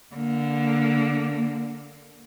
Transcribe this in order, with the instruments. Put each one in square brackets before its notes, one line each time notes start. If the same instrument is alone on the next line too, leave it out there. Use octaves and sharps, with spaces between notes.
[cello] D3 A#3